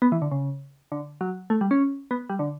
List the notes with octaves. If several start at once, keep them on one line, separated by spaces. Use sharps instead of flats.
B3
E3
D3
C#3
D3
F#3
A3
G3
C#4
B3
G3
D3